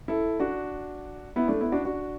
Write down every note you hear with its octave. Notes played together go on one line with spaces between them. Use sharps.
E4 A4
D4 F#4
B3 E4
A3 D4
B3 E4
D4 F#4
D4 F#4